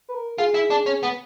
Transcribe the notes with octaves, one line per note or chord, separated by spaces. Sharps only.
B4
A#4
F4 G#4
E4
D4
C#4
B3